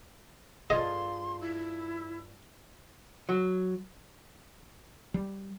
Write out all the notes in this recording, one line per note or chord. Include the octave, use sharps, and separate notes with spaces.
G2 F4 G#4 D#5 C6
E4
F#3
G3